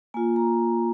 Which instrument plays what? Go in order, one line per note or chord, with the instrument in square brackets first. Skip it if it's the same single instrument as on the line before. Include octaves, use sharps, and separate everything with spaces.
[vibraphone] A#3 F4 G#5
A#5